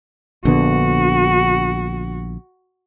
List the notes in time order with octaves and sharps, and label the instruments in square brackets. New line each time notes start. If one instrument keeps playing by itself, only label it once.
[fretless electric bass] A#1 D3 B3 [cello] F#4